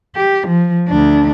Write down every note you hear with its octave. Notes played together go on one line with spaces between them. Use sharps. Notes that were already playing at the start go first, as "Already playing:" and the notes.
G4
F3
D2 D4